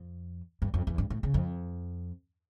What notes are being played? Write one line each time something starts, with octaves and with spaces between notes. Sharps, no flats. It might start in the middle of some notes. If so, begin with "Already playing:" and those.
Already playing: F2
G2
F2
E2
G2
A2
C#3
F2